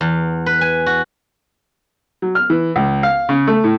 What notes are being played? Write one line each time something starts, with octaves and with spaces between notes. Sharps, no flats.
E2
B4
G#5
F#4
F#3
F6
E3
C#2
F5
C#3
A3
A2